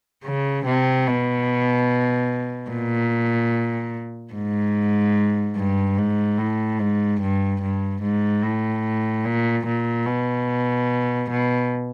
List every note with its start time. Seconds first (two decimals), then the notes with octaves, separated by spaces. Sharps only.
0.24 C#3
0.66 C3
1.07 B2
2.70 A#2
4.34 G#2
5.56 G2
5.97 G#2
6.38 A2
6.79 G#2
7.21 G2
7.62 G2
8.02 G#2
8.42 A2
9.25 A#2
9.66 A#2
10.06 B2
11.30 B2